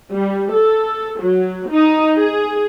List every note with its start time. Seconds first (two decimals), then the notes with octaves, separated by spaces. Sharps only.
0.13 G3
0.53 A4
1.21 F#3
1.71 D#4
2.18 G#4